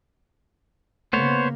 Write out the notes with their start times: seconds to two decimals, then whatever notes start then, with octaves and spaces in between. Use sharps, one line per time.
1.13 C#3 A#3 B3 C5 C#5